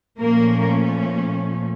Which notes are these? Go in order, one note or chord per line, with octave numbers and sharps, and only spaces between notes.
A#2 F3 A3 A#3 C#4 A#4